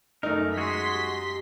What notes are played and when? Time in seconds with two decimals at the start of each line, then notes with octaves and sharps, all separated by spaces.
0.23 F#2 A3 D#4 A#4
0.57 G#3 F#4 G#4 C6 B6
0.94 G4